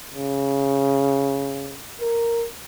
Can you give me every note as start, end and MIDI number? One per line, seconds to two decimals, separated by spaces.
0.15 1.78 49
2.01 2.45 70